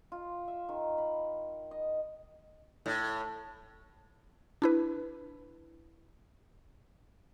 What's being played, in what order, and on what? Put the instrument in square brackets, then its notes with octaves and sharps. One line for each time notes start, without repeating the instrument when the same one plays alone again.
[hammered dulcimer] F4
E5
D#3
B5
D#5
[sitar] A2
[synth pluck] D4 E4 B4